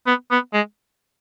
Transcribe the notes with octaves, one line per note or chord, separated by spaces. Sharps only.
B3
B3
G#3